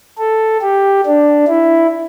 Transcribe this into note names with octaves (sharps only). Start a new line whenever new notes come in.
A4
G4
D4
E4